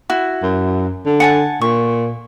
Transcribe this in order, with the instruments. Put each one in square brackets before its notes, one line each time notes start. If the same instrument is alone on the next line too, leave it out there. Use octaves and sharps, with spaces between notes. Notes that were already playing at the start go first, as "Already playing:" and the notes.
[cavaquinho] E4 F#4
[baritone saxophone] F#2
D3
[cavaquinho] F#5 G#5 A5
[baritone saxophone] A#2 [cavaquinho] C#6